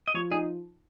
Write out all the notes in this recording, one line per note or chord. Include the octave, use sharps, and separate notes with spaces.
D#5
F3 C#5
D#4 G#4